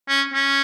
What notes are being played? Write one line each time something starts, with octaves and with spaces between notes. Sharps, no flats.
C#4
C#4